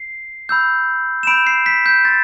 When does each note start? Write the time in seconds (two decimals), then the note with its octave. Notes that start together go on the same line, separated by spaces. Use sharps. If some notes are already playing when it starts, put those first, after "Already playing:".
Already playing: C7
0.49 B5 E6 G6
1.23 E7
1.27 B5 E6 G6 D7
1.47 C7
1.66 B6
1.86 G6
2.05 C6 G6 A6